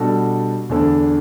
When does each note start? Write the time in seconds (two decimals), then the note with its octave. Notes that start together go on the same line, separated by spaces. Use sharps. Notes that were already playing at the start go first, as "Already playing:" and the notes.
Already playing: B2 G3 D4 F#4 A4
0.69 E2 D3 A3 D4 A4